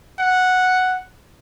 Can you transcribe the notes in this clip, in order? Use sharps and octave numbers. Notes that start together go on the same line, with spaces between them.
F#5